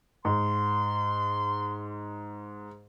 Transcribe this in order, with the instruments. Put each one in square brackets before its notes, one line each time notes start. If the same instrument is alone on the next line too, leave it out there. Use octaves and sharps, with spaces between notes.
[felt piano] G#2 [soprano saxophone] C6